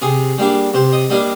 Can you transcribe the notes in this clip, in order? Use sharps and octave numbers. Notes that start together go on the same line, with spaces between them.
C3 G#4
G3 A#3 D4
C3 C5
D#5
G3 A#3 D4 D#5